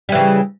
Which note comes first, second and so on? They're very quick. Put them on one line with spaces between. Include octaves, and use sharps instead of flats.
G3 E3 C#3